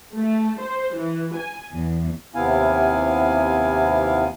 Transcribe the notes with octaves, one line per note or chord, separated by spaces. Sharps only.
A3
C5
E3
G#5
E2
D#2 C3 B3 E4 F5 G#5